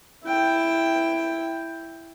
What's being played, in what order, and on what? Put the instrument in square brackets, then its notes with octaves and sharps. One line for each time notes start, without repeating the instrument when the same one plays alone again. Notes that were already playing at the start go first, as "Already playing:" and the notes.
[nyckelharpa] E4 G5